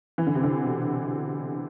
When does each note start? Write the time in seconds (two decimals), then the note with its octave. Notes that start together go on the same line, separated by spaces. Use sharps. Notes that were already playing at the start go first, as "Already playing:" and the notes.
0.18 E3
0.27 D3
0.35 C3
0.44 D3
0.64 B2